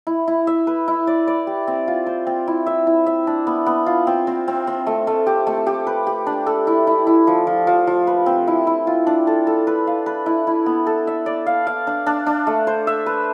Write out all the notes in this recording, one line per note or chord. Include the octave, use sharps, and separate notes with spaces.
E4
E4
E5
B4
E4
D5
D5
G4
C4
F4
C5
C4
E4
E5
E4
E5
D4
B3
B3
F4
C4
C4
C4
C4
A3
A3
G4
A3
G4
B4
G4
D4
A4
E4
E4
E4
F3
F3
F3
F3
B4
C4
E4
E4
F4
D4
A4
A4
B4
F5
B4
E4
E4
B3
A4
E5
D5
F5
F5
D4
D4
D4
A3
C5
E5
B4